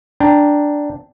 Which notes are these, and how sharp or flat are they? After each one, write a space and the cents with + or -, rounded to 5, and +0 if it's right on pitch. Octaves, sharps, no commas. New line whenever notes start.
D4 +0 G5 +0 A#5 +0